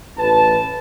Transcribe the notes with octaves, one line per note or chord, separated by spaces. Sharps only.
A1 B4 A5